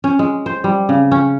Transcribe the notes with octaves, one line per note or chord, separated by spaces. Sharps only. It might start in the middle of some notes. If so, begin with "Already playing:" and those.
C#4
G#3
C5
G3
C#3
C#4